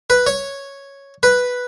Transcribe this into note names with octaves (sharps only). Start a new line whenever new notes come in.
B4
C#5
B4